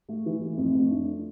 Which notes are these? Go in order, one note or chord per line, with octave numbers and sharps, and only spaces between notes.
A3
E3
A3
F2
A3
D4